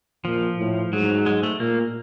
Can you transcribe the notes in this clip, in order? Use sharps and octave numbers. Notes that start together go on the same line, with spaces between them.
A#2 F3
A2
G#2 F#3
G#3
A3
A#2 A#3